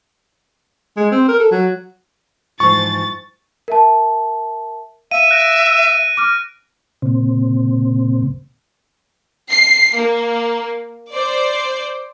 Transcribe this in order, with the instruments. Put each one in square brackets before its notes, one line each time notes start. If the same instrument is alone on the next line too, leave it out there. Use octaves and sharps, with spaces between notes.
[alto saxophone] G#3
C4
A#4
A4
F#3
[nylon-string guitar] G#2 E3 F3 [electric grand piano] C#6 [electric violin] A6
[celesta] A#4 E5 A5
[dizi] E5 [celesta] F5 [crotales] D#7
[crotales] F#6 A#6 D7
[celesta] D6 F6
[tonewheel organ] A#2 C#3 C4
[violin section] C7
A#3
C5 D5